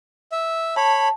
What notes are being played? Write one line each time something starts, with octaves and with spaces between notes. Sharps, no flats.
E5
C#5 A5 B5